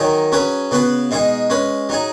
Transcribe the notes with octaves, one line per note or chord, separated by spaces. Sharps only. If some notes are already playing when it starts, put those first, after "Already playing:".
Already playing: D#3 F#3 D#4 G#4
F#3 C#4 G#4 B4
C#3 B3 F#4 B4
B2 G#3 D#4 G#4
G#3 C#4 B4
F#3 D#4 G#4